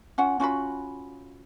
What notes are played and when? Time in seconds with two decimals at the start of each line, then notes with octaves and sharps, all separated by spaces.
0.18 C#4 F4 F#5
0.40 C#4 F4 F#4 B5